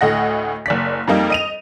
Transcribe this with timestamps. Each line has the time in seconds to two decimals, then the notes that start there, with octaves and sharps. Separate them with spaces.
0.01 D2 A2 D#5 F#5 A#6
0.66 F#1 D5 B6
1.08 F2 G3 A#3 D#4
1.30 D#5 D#7 F7